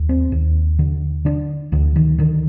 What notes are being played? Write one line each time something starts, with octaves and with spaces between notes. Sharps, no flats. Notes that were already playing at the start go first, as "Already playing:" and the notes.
Already playing: D#2
C4
D#2
D3
D3 D4
D2 D3
D#3
D3 D#3